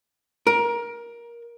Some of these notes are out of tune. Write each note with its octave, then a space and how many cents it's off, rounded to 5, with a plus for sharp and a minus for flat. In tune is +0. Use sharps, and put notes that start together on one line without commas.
A#4 +20